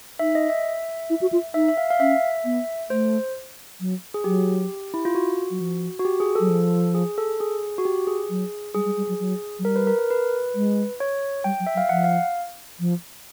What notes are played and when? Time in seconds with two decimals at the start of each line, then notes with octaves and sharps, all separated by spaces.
0.19 D#4 E5
0.35 D#5
0.50 E5
1.10 E4
1.21 F#4
1.32 F4
1.54 D#4 E5
1.68 E5
1.77 F5
1.90 F5
2.00 C#4 E5
2.45 B3
2.90 A3 C5
3.80 F#3
4.14 G#4
4.24 F#3 G4
4.94 E4
5.05 F4
5.15 F#4
5.50 F#3
5.60 F3
6.00 F#4
6.05 G4
6.20 G#4
6.35 F#3 A4
6.49 F3
6.95 G#4
7.18 A4
7.40 G#4
7.78 F#4
7.85 G4
8.07 G#4
8.30 F#3
8.75 G3 G#4
8.85 G3
8.97 G3
9.09 F#3
9.20 F#3
9.59 F#3
9.64 G3 A#4
9.76 B4
9.87 A#4
9.99 A#4
10.10 B4
10.55 G#3
11.00 C#5
11.44 G3 G5
11.60 F#3
11.67 E5
11.74 F#3
11.77 F5
11.89 F3 F#5
12.04 F5
12.80 F3